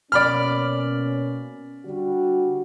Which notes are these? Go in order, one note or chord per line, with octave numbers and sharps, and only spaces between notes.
B2 A#3 C#4 D5 B5 F6
D3 G3 F#4